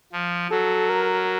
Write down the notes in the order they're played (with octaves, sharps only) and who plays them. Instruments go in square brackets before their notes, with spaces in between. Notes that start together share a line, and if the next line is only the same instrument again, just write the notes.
[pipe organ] F3
[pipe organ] F#3 [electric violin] A4
[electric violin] A#4